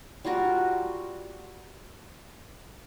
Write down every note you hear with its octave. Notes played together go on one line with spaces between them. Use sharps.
G3 F4 F#4 A#4